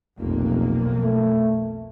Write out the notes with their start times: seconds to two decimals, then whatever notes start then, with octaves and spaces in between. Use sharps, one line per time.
0.19 F1 B1 F2 A#3
1.02 A3